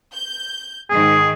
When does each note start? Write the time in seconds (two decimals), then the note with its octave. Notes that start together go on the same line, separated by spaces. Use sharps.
0.15 G6
0.90 G#2 D#3 G#4